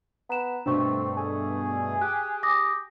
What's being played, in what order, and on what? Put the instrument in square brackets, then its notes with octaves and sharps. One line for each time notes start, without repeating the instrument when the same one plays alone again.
[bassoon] B3 [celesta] A#5 E7
[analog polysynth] G2 B2 A3 [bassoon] C4 [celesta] D4 C#6
[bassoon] G#4
[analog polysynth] G4 [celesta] F#6
[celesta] D6 D#6 A#6